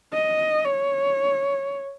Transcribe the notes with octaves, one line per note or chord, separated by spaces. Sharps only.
D#5
C#5